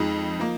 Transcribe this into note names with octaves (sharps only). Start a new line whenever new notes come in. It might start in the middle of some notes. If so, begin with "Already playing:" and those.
Already playing: F2 F3 G#3 D#4
F3 A#3